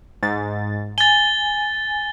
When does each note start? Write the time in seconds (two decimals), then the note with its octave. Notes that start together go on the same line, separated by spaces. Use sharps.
0.22 G#2 A6
0.98 G#5 A6 G7